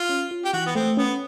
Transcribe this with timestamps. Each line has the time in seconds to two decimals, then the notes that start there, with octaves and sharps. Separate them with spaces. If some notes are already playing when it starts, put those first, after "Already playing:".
Already playing: F4
0.09 C#4
0.31 F4
0.45 G4
0.53 E3 F#4
0.66 B3
0.75 A3 C4
0.97 B3 C#4